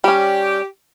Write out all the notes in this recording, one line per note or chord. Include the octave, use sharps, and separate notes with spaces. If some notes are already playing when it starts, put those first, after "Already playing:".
G3 C#4 G4